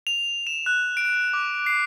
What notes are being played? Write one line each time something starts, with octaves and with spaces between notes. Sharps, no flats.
F7
E7
F#6
D7
D6
C7